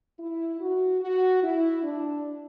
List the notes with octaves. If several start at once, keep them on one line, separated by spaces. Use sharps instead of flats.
E4
F#4
F#4
E4
D4